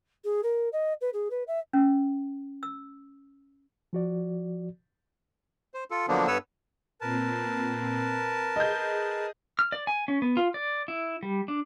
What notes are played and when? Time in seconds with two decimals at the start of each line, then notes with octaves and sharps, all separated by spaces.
0.24 G#4
0.43 A#4
0.72 D#5
1.01 B4
1.13 G#4
1.30 B4
1.47 E5
1.73 C#4
2.63 E6
3.93 F3 F#4 D5
5.74 C5
5.91 F4 A4
6.08 D3 F3 F#3 A#3 B3 D4
6.27 G2 B3 A4 B4 C#5 E6
7.01 A#2 C4 A#4 B4 A5
8.56 G#4 D#5 G6
9.59 F6
9.72 D5
9.87 G#5
10.08 C#4
10.22 B3
10.37 F4
10.54 D5
10.88 E4
11.23 G3
11.48 D4